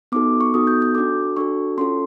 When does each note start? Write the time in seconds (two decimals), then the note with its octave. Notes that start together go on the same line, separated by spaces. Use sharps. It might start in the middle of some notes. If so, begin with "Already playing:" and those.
0.12 B3 D#4 F#4 A4 D6
0.41 C#6
0.54 B3 D#4 F#4 A4 D#6
0.67 G6
0.82 G6
0.95 D4 F#4 A4 D6
1.36 D4 F#4 A4 C#6
1.78 C#4 F4 A4 C6